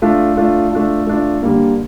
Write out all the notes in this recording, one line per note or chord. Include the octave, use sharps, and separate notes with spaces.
A3 D4 F4
A3 D4 F4
A3 D4 F4
A3 D4 F4
D3 G3 A#3